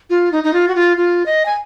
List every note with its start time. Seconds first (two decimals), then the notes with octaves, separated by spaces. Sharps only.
0.10 F4
0.32 D#4
0.44 D#4
0.54 F4
0.68 F#4
0.75 F4
0.97 F4
1.26 D#5
1.46 G#5